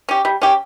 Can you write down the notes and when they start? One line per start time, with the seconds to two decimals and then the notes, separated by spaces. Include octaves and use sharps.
0.09 C#4 G4
0.25 G3
0.42 C#4 G4